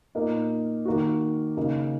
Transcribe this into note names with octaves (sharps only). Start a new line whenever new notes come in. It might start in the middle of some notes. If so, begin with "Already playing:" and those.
A#2 A#3 D#4
D#3 A#3 F#4
C#3 A#3 D#4 F#4